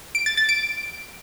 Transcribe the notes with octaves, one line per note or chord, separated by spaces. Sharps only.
D7
A6
A6
D7